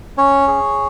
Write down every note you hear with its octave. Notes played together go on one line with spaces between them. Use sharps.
C#4 C#5
G#4